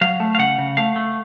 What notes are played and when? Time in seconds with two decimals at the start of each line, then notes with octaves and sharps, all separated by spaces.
0.01 F#3 F5
0.20 A3
0.35 F5
0.39 C#3 F#5
0.58 C#3
0.77 A3 F5
0.96 A3